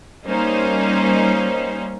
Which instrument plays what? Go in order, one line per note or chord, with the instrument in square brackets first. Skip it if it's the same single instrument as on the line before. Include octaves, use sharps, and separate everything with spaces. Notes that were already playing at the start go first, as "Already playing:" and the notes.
[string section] G3 A#3 C#4 D#4 C5